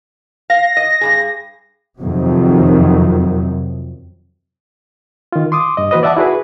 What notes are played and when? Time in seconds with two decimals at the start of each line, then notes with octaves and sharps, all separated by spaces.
0.50 F5 A#6
0.77 D#5
1.01 G2 B2 G#4
2.00 F2 C3 D#3 F#3
5.32 D#3 F4
5.52 C6 D6 D#6
5.77 G2 D#5
5.91 E3 A#3 F#4 B4 C5 D#5
6.03 D5 E5 F#5 A5 D6
6.17 E4 F#4 G#4 B4